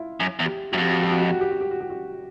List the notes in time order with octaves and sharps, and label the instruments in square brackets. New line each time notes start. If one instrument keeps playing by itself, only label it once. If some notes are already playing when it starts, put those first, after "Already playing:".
Already playing: [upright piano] E4 F4
[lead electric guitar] F#2
E2
[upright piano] G4
[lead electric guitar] F#2 [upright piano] F#4
[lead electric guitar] F2 [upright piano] G4
[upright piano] F#4
G4
F#4
G4
F#4
G4
F#4
G4
F#4
G4
F#4